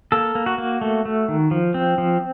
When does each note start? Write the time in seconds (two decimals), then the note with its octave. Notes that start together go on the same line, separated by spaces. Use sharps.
0.12 A#3 A4
0.35 A#3
0.46 F#4
0.58 A#3
0.81 A3
1.05 A3
1.28 D#3
1.51 F3
1.74 C4
1.98 F3